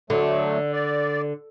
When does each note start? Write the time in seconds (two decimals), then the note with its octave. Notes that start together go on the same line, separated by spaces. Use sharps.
0.10 D3 F#3 A3
0.73 D5